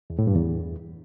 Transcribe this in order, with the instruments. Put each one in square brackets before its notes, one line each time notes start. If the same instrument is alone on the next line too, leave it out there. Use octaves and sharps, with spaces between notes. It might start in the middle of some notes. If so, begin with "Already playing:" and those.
[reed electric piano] E2
A2
G2
E2